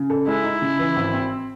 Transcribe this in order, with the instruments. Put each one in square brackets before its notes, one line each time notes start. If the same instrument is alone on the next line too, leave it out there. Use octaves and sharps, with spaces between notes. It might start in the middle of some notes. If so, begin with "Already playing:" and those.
Already playing: [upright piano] C#3
A4
[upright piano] G#3 [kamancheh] E4
[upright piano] D#4
C#3
E3
G#1
C4